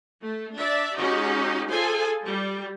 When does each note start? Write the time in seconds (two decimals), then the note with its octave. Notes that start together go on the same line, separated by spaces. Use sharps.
0.22 A3
0.57 D4 D5 E5
0.96 G#3 C#4 D#4 F#4 G4
1.69 F4 G#4 A4 C5 G#5
2.24 G3